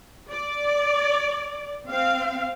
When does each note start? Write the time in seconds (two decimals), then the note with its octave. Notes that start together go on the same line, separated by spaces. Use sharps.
0.32 D5
1.87 C4 F5